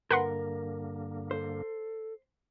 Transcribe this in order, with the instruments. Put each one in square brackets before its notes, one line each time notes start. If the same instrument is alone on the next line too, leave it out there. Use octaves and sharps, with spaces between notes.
[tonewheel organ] G2 D3 A#3 [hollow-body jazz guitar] A#4 [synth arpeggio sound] B4 F#5 C6
[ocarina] A4 [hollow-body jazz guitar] C5